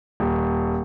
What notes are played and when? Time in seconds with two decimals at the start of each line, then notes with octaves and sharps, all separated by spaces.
0.20 D#1